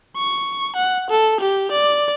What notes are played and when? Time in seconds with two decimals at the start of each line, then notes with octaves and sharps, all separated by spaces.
0.17 C#6
0.76 F#5
1.10 A4
1.40 G4
1.72 D5